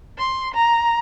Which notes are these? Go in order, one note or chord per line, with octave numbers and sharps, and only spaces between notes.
C6
A#5